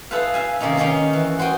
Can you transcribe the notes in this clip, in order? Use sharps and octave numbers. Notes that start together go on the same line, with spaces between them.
E4 G#4 A4 B4 C5 F5
E5 F5 G#5
C3 D#3 A#3 C#4 D#4
D#3 C#4 D#4 G#4 A#5 C6
E3
F#4 C5 D#5 G5 G#5